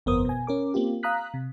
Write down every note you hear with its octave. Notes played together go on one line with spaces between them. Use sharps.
G1 F2 B3 A#4 C5 D#6
B2 G#5
C#4 A#4 D6
A#3 C4 F4 G4
F5 A#5 D#6 F#6 B6
C3